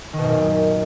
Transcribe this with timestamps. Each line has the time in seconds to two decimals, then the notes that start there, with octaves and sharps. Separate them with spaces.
0.13 D#3
0.18 B2
0.24 F#2
0.29 A#2